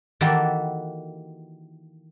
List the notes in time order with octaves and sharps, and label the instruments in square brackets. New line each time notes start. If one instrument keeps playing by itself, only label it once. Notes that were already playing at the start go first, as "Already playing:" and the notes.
[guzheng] D#3 E3 A#3 F#4 G4 A4